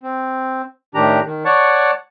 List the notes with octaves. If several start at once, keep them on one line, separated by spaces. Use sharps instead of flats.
C4
A2 D#3 D4 G4 A#5
D#3
C#5 D5 F#5 A5 C#6